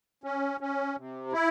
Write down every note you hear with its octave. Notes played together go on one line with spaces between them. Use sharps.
C#4
C#4
C3
E4